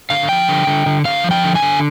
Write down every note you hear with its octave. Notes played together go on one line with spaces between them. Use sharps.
D3 F5
F3 G5
D3
D3
D3
D3 F5
F3
G5
D3
G#5
D3